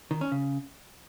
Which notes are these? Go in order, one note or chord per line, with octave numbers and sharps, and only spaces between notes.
D#3
C#4
C#3